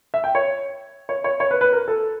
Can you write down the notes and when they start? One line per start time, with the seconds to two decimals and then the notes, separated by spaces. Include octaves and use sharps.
0.14 E5
0.24 G5
0.35 C#5
1.09 C#5
1.24 C#5
1.40 C#5
1.51 B4
1.61 B4
1.73 A#4
1.88 A4